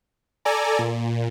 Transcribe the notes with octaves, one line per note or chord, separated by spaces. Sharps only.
A4 D5 G#5 A#5
A#2